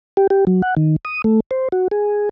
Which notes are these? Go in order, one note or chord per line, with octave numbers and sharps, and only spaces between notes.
G4
G4
F#3
F#5
D#3
D#6
A3
C5
F#4
G#4